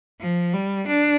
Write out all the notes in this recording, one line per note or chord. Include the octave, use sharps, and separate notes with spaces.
F3
G3
D4